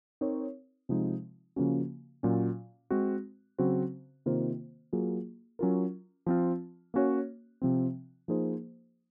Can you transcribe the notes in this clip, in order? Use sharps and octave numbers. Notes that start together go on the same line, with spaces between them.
C4 D#4 A#4 C#5
C3 F3 G#3 D#4
C#3 F3 A#3 C#4 F#4
A#2 F#3 C#4 F4
G#3 C4 F#4
C#3 F#3 C4 F#4 C5
C3 D#3 A#3 F4 C5
F#3 A#3 F4 G#4
F#3 C#4 F4 A#4
F3 C4 F4
A#3 C#4 F#4 C#5
C3 F3 C4
F3 A#3 D#4 G#4 C5